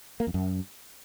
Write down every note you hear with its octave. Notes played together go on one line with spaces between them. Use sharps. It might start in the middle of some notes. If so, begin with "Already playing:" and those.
A#3
F2
F#2